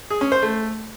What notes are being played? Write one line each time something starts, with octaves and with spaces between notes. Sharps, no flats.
G#4
C#4
C5
A3